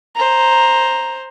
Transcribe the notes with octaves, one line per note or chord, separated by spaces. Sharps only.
C5 A#5